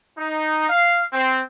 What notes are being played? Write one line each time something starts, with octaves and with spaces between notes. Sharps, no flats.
D#4
F5
C4